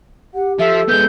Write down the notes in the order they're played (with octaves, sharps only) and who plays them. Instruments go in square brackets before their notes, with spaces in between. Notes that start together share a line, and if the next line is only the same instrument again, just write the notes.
[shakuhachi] G4 [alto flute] F#5
[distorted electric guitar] F3 [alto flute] A4 [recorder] E5
[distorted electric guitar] G#3 B3 [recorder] G6